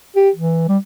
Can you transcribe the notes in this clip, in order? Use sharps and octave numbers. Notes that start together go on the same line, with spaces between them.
G4
E3
G3